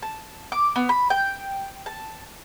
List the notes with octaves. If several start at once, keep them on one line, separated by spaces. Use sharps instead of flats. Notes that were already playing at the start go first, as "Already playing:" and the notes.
A5
D6
B3
B5
G5
A5